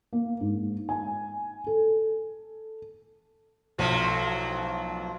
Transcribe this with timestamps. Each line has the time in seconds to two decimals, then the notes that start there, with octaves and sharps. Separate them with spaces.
0.13 A#3
0.40 G#2
0.89 G#5
1.67 A4
3.78 B1 A2 F3 F#3